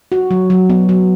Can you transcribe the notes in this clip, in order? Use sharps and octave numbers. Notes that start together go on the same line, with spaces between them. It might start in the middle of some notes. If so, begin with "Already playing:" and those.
F#4
F#3
F#3
B3
F#3